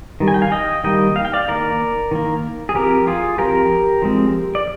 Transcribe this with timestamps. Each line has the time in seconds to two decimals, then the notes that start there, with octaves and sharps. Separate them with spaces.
0.20 D#3 G3
0.28 G#5
0.34 G5
0.42 F5 G#5
0.52 D#5 G5
0.84 D#3 G3 A#3 D#5 G5
1.16 F5
1.25 G5
1.33 D5 F5
1.48 D#3 A#3 A#4 D5
2.11 D#3 A#3
2.69 G#4
2.75 F3 C4 G4 A#4
3.07 F4 G#4
3.38 F3 C4 G4 A#4
4.02 F3 G#3 C4
4.55 D5